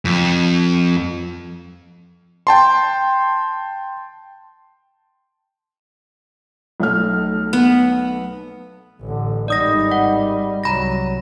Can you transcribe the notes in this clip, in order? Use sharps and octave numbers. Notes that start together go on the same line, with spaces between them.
F2
G5 A5 C6
B1 A3 F6
B3
A1 D3
G#1 G3 D#4 D5 D#6 A#6
F#5
C2 F#3 A#5 B5 A#6